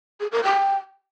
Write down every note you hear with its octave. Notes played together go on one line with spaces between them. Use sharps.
G#4
A#4
G5